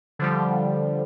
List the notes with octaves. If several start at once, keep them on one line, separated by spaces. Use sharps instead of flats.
D3 F3 G3